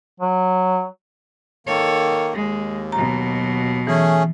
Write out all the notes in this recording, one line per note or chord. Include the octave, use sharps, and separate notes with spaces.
F#3
D#3 A#3 A4 C#5
D#2 G#3
B2 F#3 A#5
E3 A3 C#4 G#4